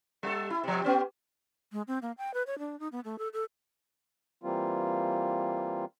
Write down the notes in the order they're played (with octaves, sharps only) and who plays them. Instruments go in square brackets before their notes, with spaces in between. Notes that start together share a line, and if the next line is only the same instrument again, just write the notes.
[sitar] G3 A4
E4
C3 F3
B3 C#4 G4
[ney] G#3
C4
A#3
G5
B4
C#5
D4
D#4
B3
A3
A4
A4
[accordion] E3 G3 A#3 C4 F4